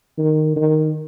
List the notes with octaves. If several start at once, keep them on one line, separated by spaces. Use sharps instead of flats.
D#3
D#3